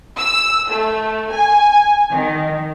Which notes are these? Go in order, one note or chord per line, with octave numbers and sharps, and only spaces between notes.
E6
A3
G#5
D#3